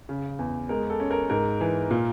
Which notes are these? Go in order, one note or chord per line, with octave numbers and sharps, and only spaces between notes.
C#3
E2
G#3 A#4
A4
C#4
A#4
G#2 A#4
E3
A#2